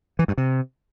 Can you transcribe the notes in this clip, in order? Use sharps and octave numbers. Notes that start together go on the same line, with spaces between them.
E3
G2
C3